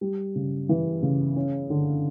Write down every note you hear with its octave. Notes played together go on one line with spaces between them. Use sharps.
G3
C#3
E3
C#3
C#4
D3